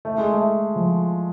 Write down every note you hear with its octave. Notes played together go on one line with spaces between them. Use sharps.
A3
G#3
A3
F3